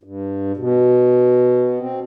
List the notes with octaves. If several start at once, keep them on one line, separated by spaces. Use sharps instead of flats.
G2
B2
C4